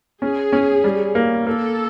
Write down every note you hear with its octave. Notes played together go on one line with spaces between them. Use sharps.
C#4 G#4
C#4
G3
A#3
A#3 A4